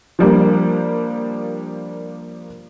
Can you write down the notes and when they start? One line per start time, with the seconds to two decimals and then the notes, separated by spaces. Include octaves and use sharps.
0.19 F3 G3 A#3 D4